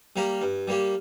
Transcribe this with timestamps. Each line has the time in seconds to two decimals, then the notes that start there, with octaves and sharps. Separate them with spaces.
0.16 G3 A#3 G4 A#4
0.42 G2
0.68 G3 A#3 G4